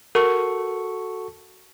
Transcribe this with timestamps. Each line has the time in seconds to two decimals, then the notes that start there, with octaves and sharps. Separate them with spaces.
0.15 F#4 A4 A#4 C#6